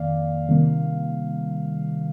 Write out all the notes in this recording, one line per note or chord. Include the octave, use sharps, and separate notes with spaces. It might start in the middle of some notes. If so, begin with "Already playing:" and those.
Already playing: F2 D#3 A#3 D5 F5
C3 D#3 G3 A#3